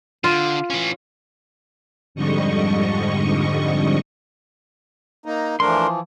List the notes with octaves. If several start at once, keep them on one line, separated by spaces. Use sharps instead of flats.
D3 F4
E3 C#4
F2 G#2 D3 G3 D#5 C#6
A#3 D#4 A#5
E3 F3 A3 D4 A#4 C6